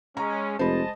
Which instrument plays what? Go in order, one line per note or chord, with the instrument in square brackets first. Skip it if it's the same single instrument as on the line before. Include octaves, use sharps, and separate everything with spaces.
[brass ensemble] G#3 C#4 [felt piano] A#5
[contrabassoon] F1 [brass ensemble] G#3 D#5 A5 [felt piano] C5 B5